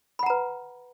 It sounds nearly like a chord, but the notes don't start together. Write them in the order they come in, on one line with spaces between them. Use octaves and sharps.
B5 F#5 A#5 B4